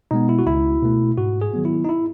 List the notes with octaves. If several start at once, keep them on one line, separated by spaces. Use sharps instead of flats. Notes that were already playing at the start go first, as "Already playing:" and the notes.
B2 G#3 B3 D#4
E4
F#4
C#2 E4
B2 A3
G#2 F#4
G#4
D#3 F#3 B3
E4
D#4
E4